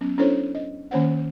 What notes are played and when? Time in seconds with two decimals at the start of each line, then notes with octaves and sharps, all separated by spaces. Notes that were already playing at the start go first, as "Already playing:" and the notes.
0.01 F#3 B3 C#4
0.18 C#4 D4 E4 A4 C5 C#5
0.55 D#5
0.91 D#3 A#3 C#4 C5 C#5 F#5